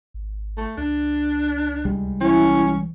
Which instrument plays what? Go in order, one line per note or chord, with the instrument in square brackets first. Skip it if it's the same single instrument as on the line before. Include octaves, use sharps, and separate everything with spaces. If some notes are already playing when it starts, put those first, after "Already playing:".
[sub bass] G#1
[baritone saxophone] A3
[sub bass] C#2 [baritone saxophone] D4
[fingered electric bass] C2 G3 G#3
[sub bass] E3 [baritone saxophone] C#4 [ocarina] E4